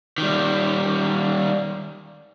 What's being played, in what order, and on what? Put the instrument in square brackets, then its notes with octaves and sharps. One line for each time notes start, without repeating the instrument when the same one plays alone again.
[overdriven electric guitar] D#3 G3